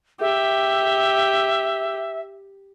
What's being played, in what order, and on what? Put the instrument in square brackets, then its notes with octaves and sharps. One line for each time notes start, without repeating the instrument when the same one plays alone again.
[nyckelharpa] G4 [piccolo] E5